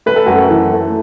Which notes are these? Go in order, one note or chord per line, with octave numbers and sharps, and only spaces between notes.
A3 B4
A4
F#2 F#4
A4
E3
A3